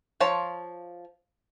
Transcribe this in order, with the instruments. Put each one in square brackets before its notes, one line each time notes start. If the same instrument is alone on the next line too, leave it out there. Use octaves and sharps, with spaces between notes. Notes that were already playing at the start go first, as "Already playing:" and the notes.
[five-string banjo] F3 F4 C#5 A5